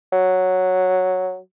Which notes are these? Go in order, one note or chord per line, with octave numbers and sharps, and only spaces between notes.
F#3